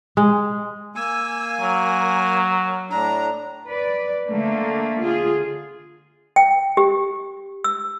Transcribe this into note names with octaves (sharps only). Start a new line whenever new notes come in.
G#3
A#3 G#5 E6
F#3 A#4
A2 D4 A#5
B4 D5
D3 A3 A#3
F4 G#4
G5
G4
E6